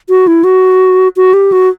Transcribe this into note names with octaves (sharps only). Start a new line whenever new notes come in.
F#4
E4
F#4
F#4
G4
F#4